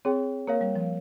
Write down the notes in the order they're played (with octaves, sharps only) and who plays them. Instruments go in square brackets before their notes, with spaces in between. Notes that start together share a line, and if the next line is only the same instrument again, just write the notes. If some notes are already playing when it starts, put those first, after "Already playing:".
[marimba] C4 [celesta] G#4 C#5 G5
[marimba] A#3 [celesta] A#4 C#5 F5
[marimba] G3
F3